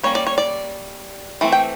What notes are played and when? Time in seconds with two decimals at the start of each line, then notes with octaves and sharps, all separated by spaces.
0.03 G3 A#3 C#4 C#5
0.15 D5
0.27 C#5
0.38 D5
1.41 E3 A3 C4
1.52 G5